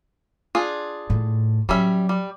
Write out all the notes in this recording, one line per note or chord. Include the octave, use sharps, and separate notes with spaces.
D4 F4 G#4
A2
F#3 G3 C#4 E5
G3